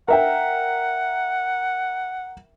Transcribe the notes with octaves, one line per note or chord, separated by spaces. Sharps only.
A#4 E5 F#5 G5